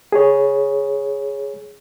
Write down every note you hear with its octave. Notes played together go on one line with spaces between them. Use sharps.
G#4 C#5